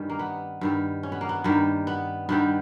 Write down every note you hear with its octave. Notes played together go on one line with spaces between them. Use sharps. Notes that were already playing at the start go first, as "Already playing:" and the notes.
Already playing: G2 D#3 G3 C#4
A#3
B3
G2 D#3 G3
C#4
B3
A#3
B3
G2 D#3 G3 A#3
B3
G2 D#3 G3 B3